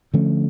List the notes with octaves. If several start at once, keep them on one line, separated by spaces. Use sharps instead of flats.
D3 F3 A3 C#4